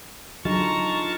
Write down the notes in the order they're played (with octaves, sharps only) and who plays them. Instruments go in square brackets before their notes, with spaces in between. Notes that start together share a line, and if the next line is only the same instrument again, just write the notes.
[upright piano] D3 D#4 G#4 [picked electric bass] F#3 [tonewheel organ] F4 A5 [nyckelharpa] A#5 C#6